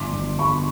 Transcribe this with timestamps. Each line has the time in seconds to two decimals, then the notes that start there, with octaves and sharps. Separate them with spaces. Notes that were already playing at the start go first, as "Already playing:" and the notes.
Already playing: G1 C6 D6
0.13 G1
0.38 G1 B5 C#6